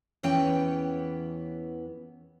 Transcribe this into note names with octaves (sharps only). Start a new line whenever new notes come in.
E2 E3 B3 C#4 C#5 G5